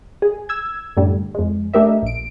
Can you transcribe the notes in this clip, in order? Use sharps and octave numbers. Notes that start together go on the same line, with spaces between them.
G#4
E6 G#6
F#2 A2 D3 G3
F2 G#3
A3 D4 G4 A#4 D#5 E5
A#1 D7